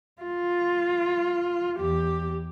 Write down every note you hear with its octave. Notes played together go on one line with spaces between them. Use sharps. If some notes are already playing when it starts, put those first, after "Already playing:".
F4
E2 G4